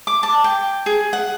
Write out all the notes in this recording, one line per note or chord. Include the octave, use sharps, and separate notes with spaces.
D6
A5
G5
G#4
F#5